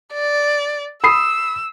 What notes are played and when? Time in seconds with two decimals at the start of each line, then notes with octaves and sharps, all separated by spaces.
0.13 D5
1.04 B5 D#6 E6 C7